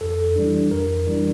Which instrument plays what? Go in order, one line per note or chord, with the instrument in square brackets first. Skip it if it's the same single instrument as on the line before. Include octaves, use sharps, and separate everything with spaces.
[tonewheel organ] F2 [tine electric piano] A4
[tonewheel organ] E3 G3 D4
[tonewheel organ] F2 [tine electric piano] A#4
[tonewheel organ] E3 G3 D4